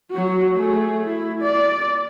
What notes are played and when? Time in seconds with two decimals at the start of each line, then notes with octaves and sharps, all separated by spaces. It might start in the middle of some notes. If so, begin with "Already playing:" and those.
0.11 F#3 F#4
0.55 A3 G#4
1.04 E4
1.42 D5